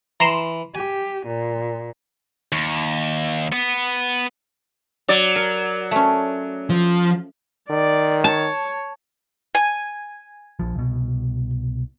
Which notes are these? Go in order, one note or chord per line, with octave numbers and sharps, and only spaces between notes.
E3 A#5 C6 E7
G4 G#5
A#2
D#2
B3
F#3 D5
A#4
A3 C#4
F3
D#3 D5
C#5 A5
G#5
A#1 F3
C2 B2